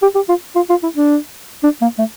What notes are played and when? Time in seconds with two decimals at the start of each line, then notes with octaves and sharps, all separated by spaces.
0.02 G4
0.15 G4
0.29 F4
0.56 F4
0.70 F4
0.83 E4
0.96 D4
1.63 D4
1.82 A#3
1.98 A3